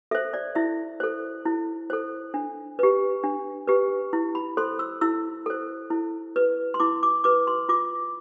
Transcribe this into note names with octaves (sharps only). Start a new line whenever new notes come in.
A4 C5 E5
D5
E4 E5
A4 C5
E4
A4 C5
D4
G4 B4
D4
G4 B4
E4
B5
A4 C5 C6
E6
E4 E6
A4 C5
E4
B4
C6
E4 D6
D6
B4 D6
C6
F4 D6